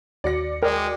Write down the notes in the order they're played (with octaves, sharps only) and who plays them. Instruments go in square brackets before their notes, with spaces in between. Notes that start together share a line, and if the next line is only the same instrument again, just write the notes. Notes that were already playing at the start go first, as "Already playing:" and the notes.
[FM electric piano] D#2 F#4 C#7 [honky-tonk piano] D5 A#6
[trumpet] G#3 [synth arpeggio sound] A#4 [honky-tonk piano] D5 G5